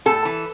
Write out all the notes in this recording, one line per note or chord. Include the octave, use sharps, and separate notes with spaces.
A2 A4
E3